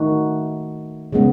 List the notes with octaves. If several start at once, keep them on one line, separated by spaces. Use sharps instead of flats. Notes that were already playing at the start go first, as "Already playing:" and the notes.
Already playing: D#3 A3 D#4 F#4
C#3 G#3 B3